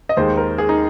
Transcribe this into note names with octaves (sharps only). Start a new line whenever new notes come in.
D#5
D#2 D#3 G#3 C5
A#4
G#4
D#4